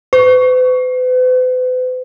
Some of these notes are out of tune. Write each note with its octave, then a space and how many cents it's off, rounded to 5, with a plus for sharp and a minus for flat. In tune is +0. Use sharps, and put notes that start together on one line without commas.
B4 +45